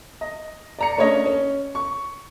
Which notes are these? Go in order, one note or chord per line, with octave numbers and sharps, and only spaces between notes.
D#5
D5 A#5 C#7
A3 A#3 C#4 D4 C#5 D#5
C#4
C#6